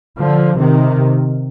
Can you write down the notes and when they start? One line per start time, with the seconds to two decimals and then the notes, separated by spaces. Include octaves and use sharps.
0.19 D3 F3
0.59 C3 D#3